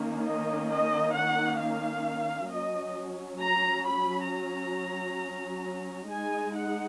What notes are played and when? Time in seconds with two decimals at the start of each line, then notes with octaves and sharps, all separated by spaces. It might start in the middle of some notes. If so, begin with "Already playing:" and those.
Already playing: D#3 A#3 C#4
0.24 D#5
0.70 D#5
1.14 F#5
1.60 F5
2.50 F#3 C#4 D#5
3.39 A#5
3.85 B5
4.29 A#5
6.10 G#3 D#4 G#5
6.55 F#5